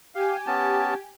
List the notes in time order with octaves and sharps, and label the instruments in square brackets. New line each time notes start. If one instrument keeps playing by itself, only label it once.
[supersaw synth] G4 G#5 [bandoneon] F5
[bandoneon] B3 C#4 A5